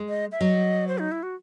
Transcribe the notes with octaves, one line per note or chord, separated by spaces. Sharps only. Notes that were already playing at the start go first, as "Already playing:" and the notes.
Already playing: G#3
D#5
E5
F#3 D#5
C5
D#4
E4
F#4